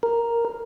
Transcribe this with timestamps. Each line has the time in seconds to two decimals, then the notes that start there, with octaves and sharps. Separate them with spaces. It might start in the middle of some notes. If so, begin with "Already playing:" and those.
0.03 A#4